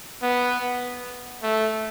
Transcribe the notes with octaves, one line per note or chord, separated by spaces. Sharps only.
B3
A3